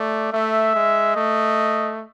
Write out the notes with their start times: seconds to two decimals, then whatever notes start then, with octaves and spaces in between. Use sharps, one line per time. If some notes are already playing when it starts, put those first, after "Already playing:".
Already playing: A3 D5
0.33 A3 E5
0.74 G#3
1.15 A3 D#5